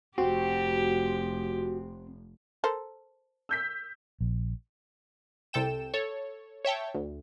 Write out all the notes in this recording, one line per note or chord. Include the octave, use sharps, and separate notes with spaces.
F1 C4 F#4 G4
A4 A#4 C5
E6 G6 B6
A#1
C2 C3 A4 G5 E7
A4 C#5
C#5 E5 G5 A5
D2